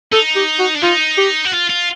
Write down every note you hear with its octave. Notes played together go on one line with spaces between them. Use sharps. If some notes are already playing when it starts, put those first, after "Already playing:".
D#4 A4
G4
F#4
D4
D#4 F4
G4
F#4
F4
F4